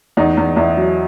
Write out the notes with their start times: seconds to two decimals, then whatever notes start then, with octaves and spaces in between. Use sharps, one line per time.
0.17 E2 D#4
0.37 E2
0.56 E2 E4
0.77 F#3